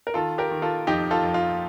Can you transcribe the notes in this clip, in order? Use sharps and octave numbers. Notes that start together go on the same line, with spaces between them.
A#4
D#3 F4 A4
G4 A#4
D#3
F4 A4
F2 D#4 G4
F4 A4
F2
F4